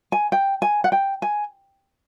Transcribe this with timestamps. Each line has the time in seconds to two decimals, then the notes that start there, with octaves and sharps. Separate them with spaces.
0.12 G#5
0.32 G5
0.62 G#5
0.84 F#5
0.92 G5
1.22 G#5